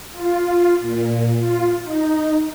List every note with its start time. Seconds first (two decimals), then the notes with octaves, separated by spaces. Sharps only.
0.13 F4
0.81 A#2
1.39 F4
1.84 D#4